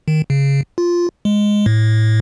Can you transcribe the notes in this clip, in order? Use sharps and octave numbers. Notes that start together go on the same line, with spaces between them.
D#3
C#3
F4
G#3
A2